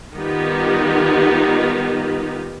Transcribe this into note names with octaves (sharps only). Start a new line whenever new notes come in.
D#3 G3 B3 D#4 F4 G4